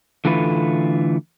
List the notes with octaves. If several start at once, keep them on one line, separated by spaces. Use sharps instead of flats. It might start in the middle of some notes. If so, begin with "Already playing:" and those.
D3 E3 A3 F4 B4